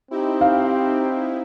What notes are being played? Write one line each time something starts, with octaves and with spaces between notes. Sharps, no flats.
C4 D#4 E4 G4
F5